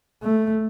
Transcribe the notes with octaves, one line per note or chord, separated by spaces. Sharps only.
A3